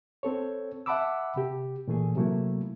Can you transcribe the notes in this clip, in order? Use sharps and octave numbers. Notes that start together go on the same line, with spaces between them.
C4 A4 C#5
E5 F#5 A5 B5 D6 E6
C3 G4
A#2 E3 A3 G#4
C3 F#3 A3 A#3 E4